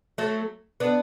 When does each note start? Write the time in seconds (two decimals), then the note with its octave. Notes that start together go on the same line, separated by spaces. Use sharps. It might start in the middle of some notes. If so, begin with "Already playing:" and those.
0.18 F#3 A3
0.80 B3 D4